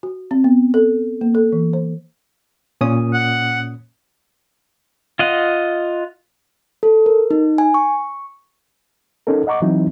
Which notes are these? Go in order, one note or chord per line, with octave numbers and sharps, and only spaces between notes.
F#4
C4
B3
A4
A#3
A4
E3
C5
A#2 C#4 D#6
F#5
F4 D#5 F#5
A4
A#4
D#4
G#5
C#6
C#4 D#4 A4 A#4
D#5 F#5 A#5 C#6 D6
E3 F#3 C4 D#4 E4